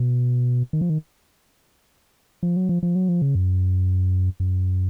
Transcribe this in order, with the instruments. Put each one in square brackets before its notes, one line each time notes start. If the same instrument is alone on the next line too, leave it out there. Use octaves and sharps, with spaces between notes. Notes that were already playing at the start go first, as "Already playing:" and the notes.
Already playing: [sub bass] B2
D#3
F3
D#3
F3
F#3
F3
F3
F#3
F3
C#3
F#2
F#2